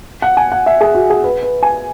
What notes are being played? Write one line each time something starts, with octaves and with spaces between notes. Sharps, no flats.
F#5
G#5
F#5
E5
G#4
F#4
G#4
B4
B4
G#5